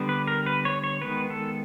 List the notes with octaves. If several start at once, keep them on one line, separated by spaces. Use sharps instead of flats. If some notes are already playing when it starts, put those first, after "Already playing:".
Already playing: D3 G3 B3
B4
A#4
B4
C#5
C#5
D#3 G#3 B3 B4
A4